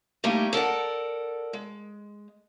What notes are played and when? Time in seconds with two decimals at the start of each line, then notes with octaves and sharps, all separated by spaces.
0.24 G3 A3 A#3 D#4 E4
0.53 A4 A#4 D5 F#5
1.53 G#3